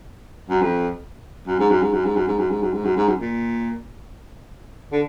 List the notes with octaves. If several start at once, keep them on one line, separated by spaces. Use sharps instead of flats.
F#2
F2
F#2
G#2
F#2
G#2
F#2
G#2
F#2
G#2
F#2
G#2
F#2
G#2
F#2
G#2
F#2
A#2
D3